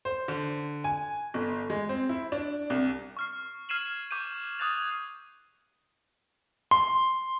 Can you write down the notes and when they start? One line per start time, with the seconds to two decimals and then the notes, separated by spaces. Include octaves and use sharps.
0.05 C5
0.28 D3
0.84 G#5
1.34 G1
1.70 G#3
1.89 C4
2.09 E4
2.32 D4
2.70 C2
3.17 C#6 F6 C7
3.69 F6 G#6 C7 D#7 E7 F#7
4.11 C#6 D6 G6 D#7
4.59 D6 D#6 F#6 G#6 A6 F7
6.71 C6